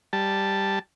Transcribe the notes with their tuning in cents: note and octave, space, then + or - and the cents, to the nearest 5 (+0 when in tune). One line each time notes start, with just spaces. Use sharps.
G3 +0 A5 +0